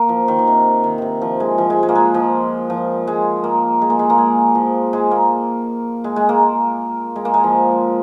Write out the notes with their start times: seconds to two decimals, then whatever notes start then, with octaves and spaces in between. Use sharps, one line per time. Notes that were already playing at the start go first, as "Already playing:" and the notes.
Already playing: A#3
0.09 F3
0.28 D#3
0.39 D#3
0.47 C3
0.84 D#3
0.98 C3 D#3
1.22 F3
1.40 G#3
1.58 F3
1.70 G#3
1.83 G#3
1.89 A#3
1.95 G#3
2.14 F3
2.70 F3
3.07 G#3
3.44 A#3
3.82 G#3
3.90 A#3
3.99 G#3
4.10 A#3
4.18 G#3
4.55 F3
4.93 G#3
5.11 A#3
6.04 G#3
6.16 G#3
6.29 A#3
7.16 G#3
7.25 A#3
7.34 G#3
7.44 F3